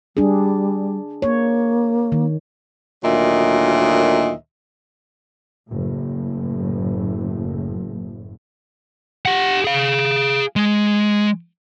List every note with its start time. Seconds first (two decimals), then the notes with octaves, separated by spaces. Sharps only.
0.17 G3 D4 G#4
1.22 A#3 C#5
2.12 D#3
3.03 D2 A#2 D#3 F#3 D#5 E5
5.69 F#1 A2
9.25 G4 F#5
9.65 G#4 F5
10.56 G#3